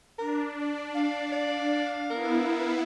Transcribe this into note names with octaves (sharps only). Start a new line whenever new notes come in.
D4 A#4
D5
F5
D5
B3 E4 A#4